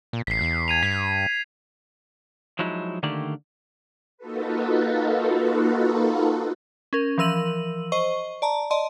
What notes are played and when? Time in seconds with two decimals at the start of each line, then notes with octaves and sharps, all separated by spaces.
0.13 A#2
0.27 A1 B6 C7
0.41 E2
0.68 G#6 D#7 F7
0.83 G2 B6
2.59 F3 F#3 G#3 D#4 E4
3.03 D3 D#3 A3 A#3 G4 D5
4.18 A#3 D#4 F4 F#4 A4 B4
6.93 C#4 A#4
7.18 E3 F3 A#4 E6 D#7 F#7
7.92 C5 D#5 C#6
8.42 D5 A5 A#5
8.71 D5 D#5 A5 C6